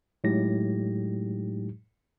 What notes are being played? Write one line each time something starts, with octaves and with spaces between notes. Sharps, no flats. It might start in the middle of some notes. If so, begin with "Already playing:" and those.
A2 F#3 G#3 D#4 G4 A#6